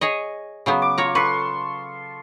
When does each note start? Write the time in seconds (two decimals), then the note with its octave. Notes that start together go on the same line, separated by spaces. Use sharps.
0.01 G#4 C#5 D#5
0.66 C#3 F#3 B3
0.82 D6
0.98 F4 C#5 A#5
1.15 A4 B4 C6 C#6